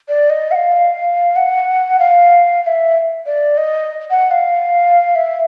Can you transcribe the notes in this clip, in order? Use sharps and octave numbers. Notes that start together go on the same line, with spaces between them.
D5
D#5
F#5
F5
F#5
F5
F5
E5
D5
D#5
F#5
F5
E5